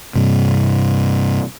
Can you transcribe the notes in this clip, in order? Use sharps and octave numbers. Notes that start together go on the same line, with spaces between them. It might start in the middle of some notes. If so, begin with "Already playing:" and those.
G2 C3